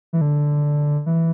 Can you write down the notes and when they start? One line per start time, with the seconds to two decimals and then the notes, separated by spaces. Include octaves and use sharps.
0.13 E3
0.21 D3
1.06 E3